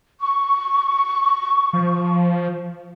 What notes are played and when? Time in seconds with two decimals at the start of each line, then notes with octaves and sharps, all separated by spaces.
0.21 C#6
1.73 F3